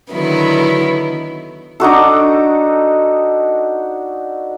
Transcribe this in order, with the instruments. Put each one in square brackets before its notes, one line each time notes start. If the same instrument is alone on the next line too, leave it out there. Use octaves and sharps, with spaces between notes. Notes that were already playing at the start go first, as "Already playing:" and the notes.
[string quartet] D3 D#3 F#3 B3 E4
[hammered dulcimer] D4 D#4 F#4 A4